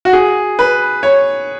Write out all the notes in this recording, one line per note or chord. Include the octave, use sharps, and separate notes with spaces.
F#4
G#4
B4
C#5